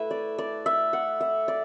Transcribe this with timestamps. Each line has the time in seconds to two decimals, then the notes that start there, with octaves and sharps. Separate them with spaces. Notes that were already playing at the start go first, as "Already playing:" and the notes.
Already playing: A3 E4 B4 E5
0.11 D5
0.38 D5
0.66 E5
0.93 F#5
1.21 E5
1.48 D5